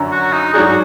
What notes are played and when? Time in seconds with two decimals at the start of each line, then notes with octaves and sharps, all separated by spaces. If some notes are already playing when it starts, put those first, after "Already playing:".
Already playing: F#2 D3 F#3
0.12 F#4
0.33 D#4
0.54 G#2 F#3 D4 F#4 G#4